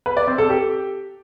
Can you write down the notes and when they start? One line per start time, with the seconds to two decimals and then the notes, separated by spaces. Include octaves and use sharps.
0.06 B4
0.17 D5
0.28 C4
0.38 A4
0.49 G4